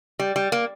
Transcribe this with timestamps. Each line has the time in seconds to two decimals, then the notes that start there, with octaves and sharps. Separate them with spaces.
0.19 G3
0.36 G3
0.52 A#3